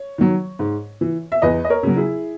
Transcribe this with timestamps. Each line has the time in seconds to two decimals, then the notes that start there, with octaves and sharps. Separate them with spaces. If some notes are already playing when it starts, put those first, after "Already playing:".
Already playing: C#5
0.18 D#3 F#3
0.59 G#2
1.01 E3
1.32 E5
1.42 E2 B4 D#5
1.64 D#5
1.70 A#4 C#5
1.83 C#3 F#3
1.97 E4 G#4